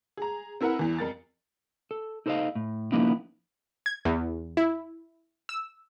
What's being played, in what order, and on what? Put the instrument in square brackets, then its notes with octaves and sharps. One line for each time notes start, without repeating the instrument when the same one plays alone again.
[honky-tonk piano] G#4 A#5
C4 E4 A#4 B4 F#5
E2 E3
F2 A#4 A6
[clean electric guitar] A4
D#4 A4 C5 C#5 D#5 F5
A2
F3 A#3 B3 C#4 D#4 E4
[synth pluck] G#6
E2
E4
E6